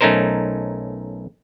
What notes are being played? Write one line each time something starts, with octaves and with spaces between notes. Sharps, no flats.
B1 A3 C#4 D#4 A#4 C5